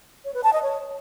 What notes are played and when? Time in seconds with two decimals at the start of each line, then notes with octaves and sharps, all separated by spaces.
0.25 C#5
0.34 B4
0.44 A5
0.53 D#5
0.63 C#5